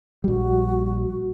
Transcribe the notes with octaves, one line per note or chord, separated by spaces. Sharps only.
A#1 G3 F#4